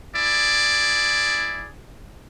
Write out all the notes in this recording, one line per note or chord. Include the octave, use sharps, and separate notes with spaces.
E4 G#4 D5